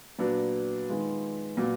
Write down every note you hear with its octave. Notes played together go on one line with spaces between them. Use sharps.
A#2 F#3 B3 D4
D#3 G#3 B3 F4
A#2 F#3 B3